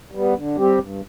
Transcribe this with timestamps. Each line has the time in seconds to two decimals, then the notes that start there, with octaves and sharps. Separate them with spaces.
0.12 G3 B3
0.35 D3
0.57 G3 C4 G4
0.79 G2